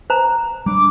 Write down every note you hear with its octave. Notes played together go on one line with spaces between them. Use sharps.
C5 A#5
G3 D4 D6